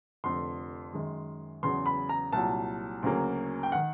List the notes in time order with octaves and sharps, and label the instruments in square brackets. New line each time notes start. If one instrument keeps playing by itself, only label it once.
[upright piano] F1 F2 D3 C6
F#2 D#3 G#3
E2 C#3 F#3 C6
B5
A#5
C2 A#2 F#3 A5
D2 C#3 F#3 A#3
G5
D#3 F#5